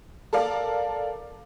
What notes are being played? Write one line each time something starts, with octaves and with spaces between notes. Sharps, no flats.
A4 A#4 D5 F5